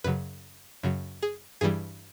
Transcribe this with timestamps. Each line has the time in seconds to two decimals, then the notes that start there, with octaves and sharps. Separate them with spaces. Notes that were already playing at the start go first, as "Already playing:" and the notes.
0.04 F#2 C#3 F#3 B4
0.83 F#2 C#3 F#3
1.22 G#4
1.61 G2 E3 G3 G#4